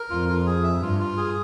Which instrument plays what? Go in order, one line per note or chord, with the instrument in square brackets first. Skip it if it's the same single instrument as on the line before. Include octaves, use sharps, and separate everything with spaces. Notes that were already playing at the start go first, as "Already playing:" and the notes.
Already playing: [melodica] A#4
[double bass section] F2 [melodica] F4
[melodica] F4
G#4
E5
[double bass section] G2 [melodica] F4
[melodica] F4
G#4